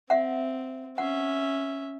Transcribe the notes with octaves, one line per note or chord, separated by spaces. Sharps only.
C4 E5 F#5
C#4 E5 F#5